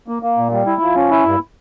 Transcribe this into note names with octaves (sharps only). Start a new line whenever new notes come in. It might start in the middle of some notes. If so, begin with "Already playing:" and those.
A#3
A#3
A#2
G3
E4
F3
C#4
E4
G2